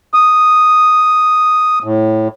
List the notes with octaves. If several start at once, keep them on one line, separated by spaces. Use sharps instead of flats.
D#6
A2